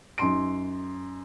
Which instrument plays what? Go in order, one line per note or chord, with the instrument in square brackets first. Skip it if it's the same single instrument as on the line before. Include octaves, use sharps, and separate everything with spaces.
[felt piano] F#2 D#4 C6 D7